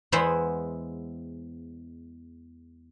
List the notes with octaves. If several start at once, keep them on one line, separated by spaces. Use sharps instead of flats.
E2 G#3 B3 E4 C5 F#5